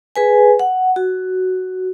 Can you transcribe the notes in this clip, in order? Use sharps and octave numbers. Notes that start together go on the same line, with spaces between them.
G#4 B4 G#5
F#5
F#4